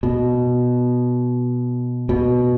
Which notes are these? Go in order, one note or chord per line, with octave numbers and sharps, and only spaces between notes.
B2
B2